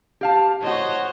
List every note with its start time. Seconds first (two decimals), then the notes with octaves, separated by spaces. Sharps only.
0.21 G4 F5 A5
0.63 A2 F#4 C5 C#5 D#5